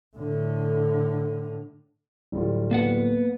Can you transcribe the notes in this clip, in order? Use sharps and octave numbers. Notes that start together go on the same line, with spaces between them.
A2 D3
D1 G3 F4
A#3 B3 F#5